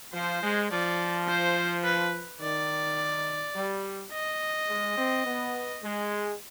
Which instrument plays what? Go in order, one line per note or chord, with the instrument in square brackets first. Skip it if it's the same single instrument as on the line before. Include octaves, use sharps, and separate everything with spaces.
[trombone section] F3 [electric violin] C5
[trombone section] G#3
[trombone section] F3 [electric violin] D5
[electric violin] C5
B4
[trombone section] D#3 [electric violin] D5
[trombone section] G3
[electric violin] D#5
[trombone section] G#3
C4
B3
G#3